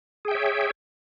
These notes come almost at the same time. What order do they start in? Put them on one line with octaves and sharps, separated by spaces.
G#4 G5 E5 C#5